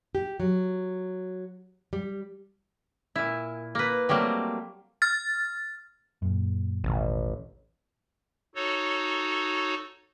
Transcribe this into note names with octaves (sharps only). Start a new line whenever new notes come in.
G4
F#3
G3
A#2 E4
A#3 B4
F#3 G3 A3 A#3 C4
F6 A6
F#2 A#2
E1 A1 B2 D#3
D#4 F#4 A4 C#5